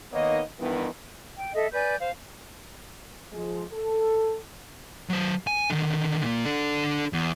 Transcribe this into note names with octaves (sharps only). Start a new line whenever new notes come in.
D#3 A#3 B3 D#4 C#5 D#5
G2 D#3 E3 B3
G5
A4 D#5 E5
B4 D5 G#5 G6
C5 F5
F3 G#3
A4
F#3 C5
G#5
D3 D#3
A#2 A#3
D4 A4
E2